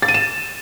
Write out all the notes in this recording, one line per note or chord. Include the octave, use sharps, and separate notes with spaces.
A6
D#7
E7